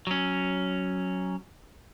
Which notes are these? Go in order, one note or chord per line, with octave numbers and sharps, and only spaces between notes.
F#3 C#4